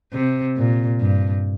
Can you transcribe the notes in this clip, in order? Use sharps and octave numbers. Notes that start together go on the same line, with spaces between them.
C3
A#2
G2